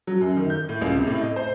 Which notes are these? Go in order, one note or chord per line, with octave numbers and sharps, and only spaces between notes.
F#3
F#2
D#3
G6
A2
C#2
C3
A2
D#5
C5